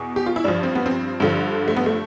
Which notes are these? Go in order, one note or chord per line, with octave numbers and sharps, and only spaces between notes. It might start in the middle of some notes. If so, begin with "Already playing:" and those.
Already playing: E2 B2
G4
F4
E4
G2 F3 D4
C4
B3
C4
G2 D3 F3
A3
B3
A3